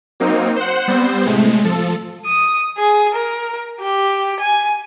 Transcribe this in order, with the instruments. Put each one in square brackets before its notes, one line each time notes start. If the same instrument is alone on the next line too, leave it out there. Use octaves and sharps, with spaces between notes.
[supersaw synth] F#3 A#3 C4 D#4
C5 F#5
G3 B3 C4 C5
A2 C3 G#3 A3
F3 A4
[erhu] D#6
G#4
A#4
G4
G#5